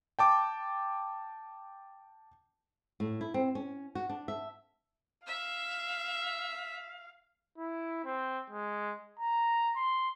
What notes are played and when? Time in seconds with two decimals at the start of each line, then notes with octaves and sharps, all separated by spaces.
0.19 G5 A5 D6
3.00 A2
3.21 E4
3.34 C4
3.55 C#4
3.95 F#4
4.10 D4
4.28 E5
5.27 E5 F5
7.58 E4
8.05 C4
8.50 G#3
9.19 A#5
9.76 C6